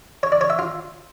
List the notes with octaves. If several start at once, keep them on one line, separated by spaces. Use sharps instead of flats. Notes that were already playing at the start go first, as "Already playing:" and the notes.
C#5
D5
C#5
E5
F4